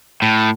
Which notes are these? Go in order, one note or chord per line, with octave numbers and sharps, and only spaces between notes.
A2